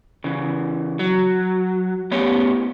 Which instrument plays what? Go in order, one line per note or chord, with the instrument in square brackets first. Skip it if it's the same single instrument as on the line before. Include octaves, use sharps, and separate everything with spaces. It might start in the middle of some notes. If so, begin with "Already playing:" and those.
[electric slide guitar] C#3 E3
F#3
A2 B3 C#4 G4 C#5